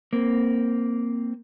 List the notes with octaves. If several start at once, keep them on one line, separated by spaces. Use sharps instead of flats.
A#3 C4